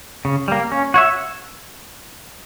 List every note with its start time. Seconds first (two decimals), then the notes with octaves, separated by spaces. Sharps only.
0.25 C#3
0.48 G3 A#3
0.72 C#4
0.94 F#4 C#5 E5